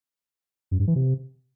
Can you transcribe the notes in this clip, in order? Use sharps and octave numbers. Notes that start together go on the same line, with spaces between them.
F#2
G2
E3
C3